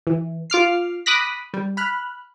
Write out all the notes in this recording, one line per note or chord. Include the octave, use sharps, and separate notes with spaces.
E3
F4 D6 F6 C7
B5 D6 D#6 F#6 A#6 B6
G3
B5 F6 F#6